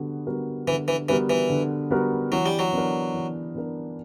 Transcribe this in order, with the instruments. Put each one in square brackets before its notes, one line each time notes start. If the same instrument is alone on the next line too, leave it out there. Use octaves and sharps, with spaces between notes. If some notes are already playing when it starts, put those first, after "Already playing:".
Already playing: [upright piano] D3 G3 B3 F#4
G3 B3 F#4 A#4
[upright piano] D3 [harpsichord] E3
[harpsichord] E3
[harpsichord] E3 [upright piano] G3 B3 F#4 A#4
[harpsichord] E3
[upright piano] D3
G3 B3 F#4 A#4
[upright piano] E3 [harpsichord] F#3
[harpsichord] G3
F#3
[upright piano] B3 D4 A#4
E3
B3 D4 A#4